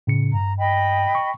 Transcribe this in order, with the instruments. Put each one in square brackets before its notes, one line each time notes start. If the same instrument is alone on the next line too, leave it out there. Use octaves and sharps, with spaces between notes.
[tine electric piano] A2 C#3 C#7
[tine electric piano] G2 [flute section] A#5
[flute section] D#5 G5 B5
[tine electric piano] C#6